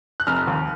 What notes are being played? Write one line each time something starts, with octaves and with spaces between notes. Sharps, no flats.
F#6
F1 F6
D#2